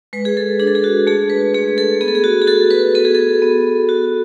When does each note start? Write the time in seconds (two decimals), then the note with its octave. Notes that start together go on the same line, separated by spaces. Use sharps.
0.13 G#3 B4
0.25 G#4
0.37 A4
0.60 D4 G#4
0.67 A4
0.75 G#4
0.84 F#4
1.07 A3 G#4
1.30 B4
1.54 A3 G#4
1.78 A4
2.01 B3 G#4
2.08 A4
2.15 G#4
2.24 F#4
2.42 G#4
2.47 F#4 A4
2.70 B4
2.95 B3 A4
3.05 G#4
3.15 A4
3.42 B3
3.89 F#4